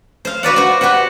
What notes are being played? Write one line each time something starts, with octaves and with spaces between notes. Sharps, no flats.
C5 F5
F#4 B4 D5 F#5
F#4 C5
F#4 G4 B4 C5 F#5